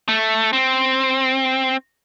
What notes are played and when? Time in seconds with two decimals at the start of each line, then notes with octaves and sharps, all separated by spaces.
0.08 A3
0.53 C4